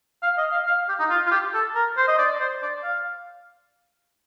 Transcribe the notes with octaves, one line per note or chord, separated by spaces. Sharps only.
F5
D#5
F5
F5
G4
D#4
F4
F4
G4
A4
A#4
C5
D#5
D5
C5
D5
F5